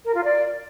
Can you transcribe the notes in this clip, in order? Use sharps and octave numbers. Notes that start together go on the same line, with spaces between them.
A#4
F4
D5